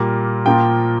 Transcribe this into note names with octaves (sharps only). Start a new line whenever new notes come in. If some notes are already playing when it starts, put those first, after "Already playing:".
Already playing: A#2 G3 A#3
A#2 F3 A#3 G5